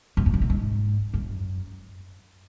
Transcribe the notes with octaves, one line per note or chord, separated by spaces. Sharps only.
F#2
F2
F#2
A#2
G#2
F#2